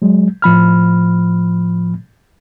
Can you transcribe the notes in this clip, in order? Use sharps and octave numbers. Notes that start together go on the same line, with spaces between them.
F#3 G#3
A2 F3 B5 F6